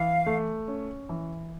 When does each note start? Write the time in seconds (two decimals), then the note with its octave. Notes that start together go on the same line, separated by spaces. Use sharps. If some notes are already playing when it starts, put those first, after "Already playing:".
Already playing: E3 F5
0.26 A3
0.68 C#4
1.09 E3